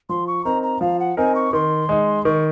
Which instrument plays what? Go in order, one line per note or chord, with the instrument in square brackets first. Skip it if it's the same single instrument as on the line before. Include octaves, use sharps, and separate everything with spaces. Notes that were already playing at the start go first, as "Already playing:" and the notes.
[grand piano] F3 [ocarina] C6
[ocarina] C#6
[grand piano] C4 D#4 A#4 [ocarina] A#5
[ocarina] A#5
[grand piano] F3 [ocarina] F5
[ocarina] F#5
[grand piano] C4 D#4 A#4 [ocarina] G#5
[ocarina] C#6
[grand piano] D#3 [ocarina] C6
[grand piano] G#3 D#4
[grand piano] D#3 [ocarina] C#6